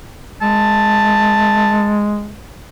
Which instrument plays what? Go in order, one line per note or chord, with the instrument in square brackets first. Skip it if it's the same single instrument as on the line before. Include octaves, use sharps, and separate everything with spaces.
[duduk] G#3 [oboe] A5